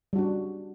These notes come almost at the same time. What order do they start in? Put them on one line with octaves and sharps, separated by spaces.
G3 F#4 D4 C#4